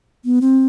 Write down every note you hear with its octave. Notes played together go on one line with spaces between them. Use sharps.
B3
C4